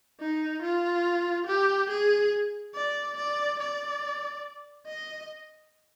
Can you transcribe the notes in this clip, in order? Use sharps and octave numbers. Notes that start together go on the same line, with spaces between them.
D#4
F4
G4
G#4
D5
D5
D5
D#5